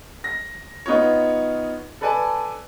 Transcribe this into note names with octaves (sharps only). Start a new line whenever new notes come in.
A#6
B3 D#4 F4 C#5
A4 B4 D5 G#5 A5